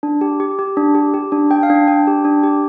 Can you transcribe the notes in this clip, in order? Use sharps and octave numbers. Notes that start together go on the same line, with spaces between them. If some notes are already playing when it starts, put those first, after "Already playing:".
D4
G4
G4
G4
D4
G4
G4
D4
D4 G5
F5
D4
G5
D4 G5
G4
D4
G4